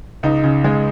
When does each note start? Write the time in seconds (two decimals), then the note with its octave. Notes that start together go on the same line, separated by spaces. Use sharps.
0.23 C#2 D#4
0.44 C#3
0.64 G#3